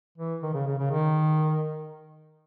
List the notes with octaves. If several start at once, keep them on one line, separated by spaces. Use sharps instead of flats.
E3
D#3
C#3
C#3
C#3
D#3